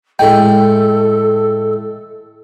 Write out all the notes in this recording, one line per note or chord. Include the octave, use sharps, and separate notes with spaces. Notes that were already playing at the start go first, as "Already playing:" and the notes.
A2 G#3 A4 G5